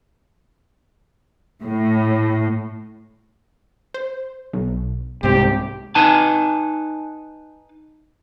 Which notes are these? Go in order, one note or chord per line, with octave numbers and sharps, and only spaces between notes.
A2
C5
B1
C2 G#2 C4 G4 C5
D#4 B4 G#5 A5